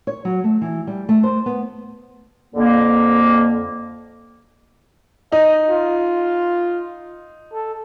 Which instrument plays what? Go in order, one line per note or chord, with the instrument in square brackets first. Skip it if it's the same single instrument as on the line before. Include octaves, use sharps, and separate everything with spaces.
[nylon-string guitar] C#5
F#3
A3
E3
G3
A3
C5
B3
[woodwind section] F2 D3 A#3
[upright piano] D#4 [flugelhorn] D#5
[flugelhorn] F4
A4